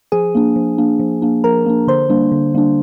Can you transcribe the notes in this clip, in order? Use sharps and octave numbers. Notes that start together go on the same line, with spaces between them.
F3 G#4 G#5
A#3 D4
F3
A#3 D4
F3
A#3 D4
F3 A#4 A#5
A#3 D4
D3 C5 C6
G3 A#3 D4
D3
G3 A#3 D4